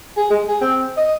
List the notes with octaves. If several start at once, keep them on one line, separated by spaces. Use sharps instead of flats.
G#4
G#3
G#4
C4
D#5